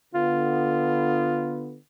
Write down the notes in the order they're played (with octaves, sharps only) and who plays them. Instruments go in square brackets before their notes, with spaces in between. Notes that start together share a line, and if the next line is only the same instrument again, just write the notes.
[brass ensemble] D3 B3 [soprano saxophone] F4